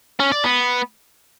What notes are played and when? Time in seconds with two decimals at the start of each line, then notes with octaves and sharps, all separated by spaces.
0.20 C#4
0.32 D5
0.44 B3